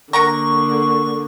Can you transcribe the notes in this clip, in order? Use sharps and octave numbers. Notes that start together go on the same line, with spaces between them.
D3 A#3 A#4 F#5 A#5 C#6